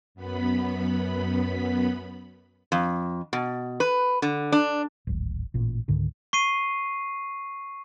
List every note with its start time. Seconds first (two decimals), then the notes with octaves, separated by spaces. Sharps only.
0.15 F#2 B3 B5
2.72 F2
3.33 B2
3.80 B4
4.22 D3
4.52 D4
5.07 D1 G#1
5.54 A1 A#2
5.88 C#2 G#2 D3 D#3
6.33 C#6 C7 D#7